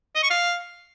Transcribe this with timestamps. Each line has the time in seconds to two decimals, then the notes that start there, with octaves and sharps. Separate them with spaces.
0.15 D#5
0.23 C#6
0.31 F5